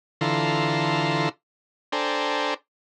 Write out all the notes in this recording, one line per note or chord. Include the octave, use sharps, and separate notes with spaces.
D3 E3 F4 A4 A#5 C6
D4 A4 C5 G5 G#5 A#5